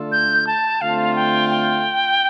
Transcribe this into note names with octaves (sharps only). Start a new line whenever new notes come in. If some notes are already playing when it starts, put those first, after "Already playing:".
Already playing: D3 A3 D4 F4 A4
G6
A5
D3 A3 C4 F4 F5
G5
G5